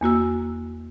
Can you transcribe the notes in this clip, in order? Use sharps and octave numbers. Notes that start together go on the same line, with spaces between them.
E2 A#3 F#4 E6